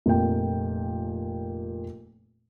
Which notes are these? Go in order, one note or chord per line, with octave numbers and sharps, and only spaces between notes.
F1 A#2 G5